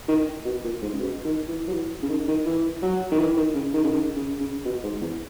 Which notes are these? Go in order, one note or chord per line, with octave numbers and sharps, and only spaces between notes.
D#3
B2
A#2
G#2
C#3
B2
D#3
E3
F#3
E3
C#3
D#3
D#3
E3
F#3
D#3
E3
D#3
C#3
D#3
C#3
D#3
C#3
C#3
B2
G#2
E2